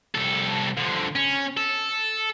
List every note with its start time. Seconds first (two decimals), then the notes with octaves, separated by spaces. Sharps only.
0.15 C2 A4
0.77 D3 F3
1.16 C#4
1.57 A4